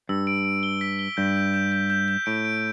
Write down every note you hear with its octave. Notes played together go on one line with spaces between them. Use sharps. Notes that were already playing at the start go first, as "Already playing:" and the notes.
G2 E6
D7
D7
G7
B6
G7
G2 G6
G6
G6
G6
G6
G6
A2 D7
D7